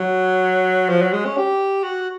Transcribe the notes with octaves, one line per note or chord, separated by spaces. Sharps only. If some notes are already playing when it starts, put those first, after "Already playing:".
Already playing: F#3
F3
F#3
G#3
C#4
G4
F#4